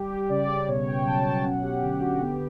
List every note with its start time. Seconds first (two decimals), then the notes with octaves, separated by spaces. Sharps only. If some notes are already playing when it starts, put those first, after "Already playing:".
Already playing: G3 G4
0.29 C#3 D5
0.68 B2 C#5
0.87 G5
1.06 F#3 A5
1.26 G5
1.44 C#4 F#5
1.62 G4
1.82 D3 G4
2.01 F#4
2.20 B3 G4